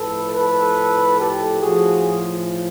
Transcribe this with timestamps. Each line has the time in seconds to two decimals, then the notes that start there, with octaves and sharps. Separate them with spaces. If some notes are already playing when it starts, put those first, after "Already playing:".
Already playing: A2 F3 A4 B4
0.33 A4 B4
1.19 G4 A4
1.63 A2 F3 F#4 G#4